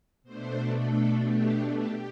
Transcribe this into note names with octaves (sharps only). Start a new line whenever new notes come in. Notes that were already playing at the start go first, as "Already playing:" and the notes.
B2 A3 D4 C5
A4
G4
G4